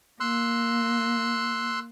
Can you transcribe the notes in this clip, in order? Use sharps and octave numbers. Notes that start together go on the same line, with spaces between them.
A#3 C6 E6 F#6